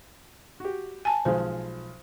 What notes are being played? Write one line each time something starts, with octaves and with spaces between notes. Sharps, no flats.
F#4 G4
G#5 A5
B1 F3 G#3 C5